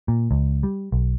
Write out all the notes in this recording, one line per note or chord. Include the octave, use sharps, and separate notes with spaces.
A#2
C#2
G3
B1